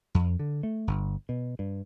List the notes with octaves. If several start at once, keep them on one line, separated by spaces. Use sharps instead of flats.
F2
D3
A3
G1
B2
G2